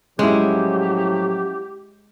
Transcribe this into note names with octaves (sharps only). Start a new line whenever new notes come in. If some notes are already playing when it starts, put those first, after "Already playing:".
A2 F3 F#3 G#3 C#4 E4 G4